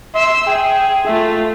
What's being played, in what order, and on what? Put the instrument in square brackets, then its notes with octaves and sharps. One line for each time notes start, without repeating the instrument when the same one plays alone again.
[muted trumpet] E5 [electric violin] C6 E6
[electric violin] G#4 [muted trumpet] G5
[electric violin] A3 F4 [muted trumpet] E5